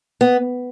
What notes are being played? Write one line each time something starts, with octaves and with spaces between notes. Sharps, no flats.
B3